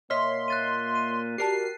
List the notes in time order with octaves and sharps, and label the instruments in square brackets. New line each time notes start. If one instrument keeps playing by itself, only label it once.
[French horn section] A#2 A#3 [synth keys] C#5 D#5 E5 [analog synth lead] C6 [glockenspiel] F6 B6
[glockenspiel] F#6 A6 D#7
D#7
[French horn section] F#4 D5 [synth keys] G4 A#4 A5 [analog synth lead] C7